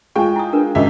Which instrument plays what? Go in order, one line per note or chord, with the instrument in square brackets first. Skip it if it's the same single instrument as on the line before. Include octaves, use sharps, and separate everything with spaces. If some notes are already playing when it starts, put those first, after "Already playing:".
[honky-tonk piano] G#3 F4 G5 [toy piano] C#6
[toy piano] E4 D#6
D4 A#4 B4
[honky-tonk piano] G#1 C#3 E5 [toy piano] D#5